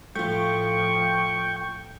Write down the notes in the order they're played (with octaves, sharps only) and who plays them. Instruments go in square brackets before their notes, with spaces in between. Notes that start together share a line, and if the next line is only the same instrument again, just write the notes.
[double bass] A2 F3 [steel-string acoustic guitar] A3 F4 [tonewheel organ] G5 C#6